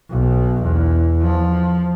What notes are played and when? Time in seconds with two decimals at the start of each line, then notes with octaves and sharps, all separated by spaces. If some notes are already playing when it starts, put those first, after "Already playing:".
0.10 B1 B2
0.63 E2
1.22 F3